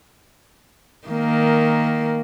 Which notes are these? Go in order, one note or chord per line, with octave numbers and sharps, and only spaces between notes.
D#3 A#3